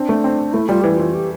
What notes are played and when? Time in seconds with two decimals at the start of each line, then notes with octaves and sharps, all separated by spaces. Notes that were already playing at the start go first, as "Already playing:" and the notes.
Already playing: C4 D4
0.09 A3
0.24 C4
0.53 A3 E4
0.69 G3 F4
0.81 E3 G4
0.95 E3 F4
1.14 G4